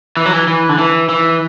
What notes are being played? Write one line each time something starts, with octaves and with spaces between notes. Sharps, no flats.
E3
F#3
E3
E3
D3
E3
E3